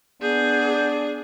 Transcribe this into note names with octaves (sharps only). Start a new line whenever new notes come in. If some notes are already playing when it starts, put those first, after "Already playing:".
B3 D4 G#4 G6